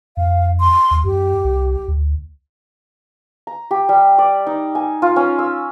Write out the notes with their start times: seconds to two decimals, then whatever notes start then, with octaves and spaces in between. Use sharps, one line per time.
0.17 F2 F5
0.60 C6
0.91 D#2
1.05 F#2 G4
1.44 C2
1.88 D2
3.47 A#5
3.71 G4
3.89 G3
4.18 D5
4.47 D#4
4.75 G#5
5.02 F4
5.16 C#4
5.39 E6